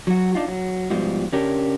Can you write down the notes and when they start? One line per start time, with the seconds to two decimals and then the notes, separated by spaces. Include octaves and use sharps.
0.07 F#3 F#4
0.35 D4 D#4 F4
0.48 F#3
0.90 G#2 B2 F3 G3
1.32 C#3 C#4 D4 G4 A#4